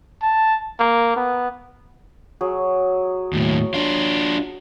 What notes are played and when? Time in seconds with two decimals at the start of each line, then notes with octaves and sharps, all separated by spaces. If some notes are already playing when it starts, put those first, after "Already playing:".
0.22 A5
0.80 A#3
1.16 B3
2.41 F#3 G#4
3.33 D#2 A2
3.74 D4 F4